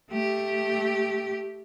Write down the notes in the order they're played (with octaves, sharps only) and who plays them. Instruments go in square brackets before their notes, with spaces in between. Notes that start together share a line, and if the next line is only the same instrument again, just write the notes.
[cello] A3 G4